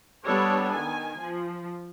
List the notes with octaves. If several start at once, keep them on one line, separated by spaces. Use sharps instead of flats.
G3 B3 D4 A4 C#5
D#3 G#5
F3